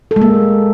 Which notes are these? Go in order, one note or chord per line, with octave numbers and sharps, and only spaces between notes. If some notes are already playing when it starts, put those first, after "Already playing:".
A4
G#3
A#3